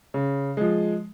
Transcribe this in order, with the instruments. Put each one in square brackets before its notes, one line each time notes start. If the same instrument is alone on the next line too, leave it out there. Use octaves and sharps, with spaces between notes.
[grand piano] C#3
F3 G#3